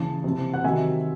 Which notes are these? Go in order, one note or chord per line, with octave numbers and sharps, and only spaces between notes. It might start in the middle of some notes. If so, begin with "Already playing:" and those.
Already playing: C#3 E3 A5
C3 E3
F#5
C3 D#3 F#3 E5 G#5